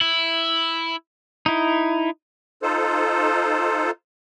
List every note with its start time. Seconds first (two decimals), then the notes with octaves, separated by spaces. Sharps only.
0.01 E4
1.46 D#4 E4
2.62 D#4 F4 A4 C5